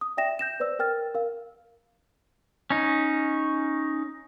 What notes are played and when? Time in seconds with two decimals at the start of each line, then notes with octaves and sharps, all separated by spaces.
0.01 D#6
0.17 D5 E5 G5 A#6 E7
0.39 G6 A#6 E7
0.60 B4 C5 D5 E6
0.79 A#4 G5 F6 A6
1.14 A#4 F5
2.70 C#4 D#4